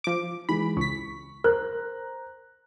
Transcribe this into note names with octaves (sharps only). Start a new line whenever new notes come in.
F3 D6
E3 G#3 B5
C#2 C#6 B6
A#4 C5 A#5 F#6